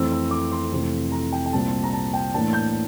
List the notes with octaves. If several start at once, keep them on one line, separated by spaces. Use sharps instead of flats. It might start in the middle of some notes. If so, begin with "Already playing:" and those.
Already playing: F2 E3 A3 C4 E6
E6
D6
C6
F2 C3 E3 A3 C4
A#5
G5
G5
C2 A#2 G3 C4 A5
A#5
A5
G5
A2 E3 A#3 D4 A5
G6